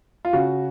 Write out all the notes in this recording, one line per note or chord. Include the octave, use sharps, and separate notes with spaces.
F4
C#3 F#4